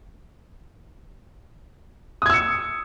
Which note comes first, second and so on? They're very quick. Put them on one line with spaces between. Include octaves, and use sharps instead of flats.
D#6 G#6 E6 C#7